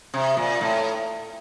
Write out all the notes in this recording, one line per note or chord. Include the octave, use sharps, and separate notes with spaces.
C3
A#2
A2